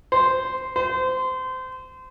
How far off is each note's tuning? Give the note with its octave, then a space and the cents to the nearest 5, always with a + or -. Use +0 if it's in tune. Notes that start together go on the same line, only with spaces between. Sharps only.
C5 -5
C5 -25